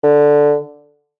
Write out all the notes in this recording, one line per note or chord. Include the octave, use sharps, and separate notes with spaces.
D3